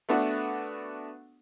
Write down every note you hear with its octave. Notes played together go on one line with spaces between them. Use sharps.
A3 B3 D4 F#4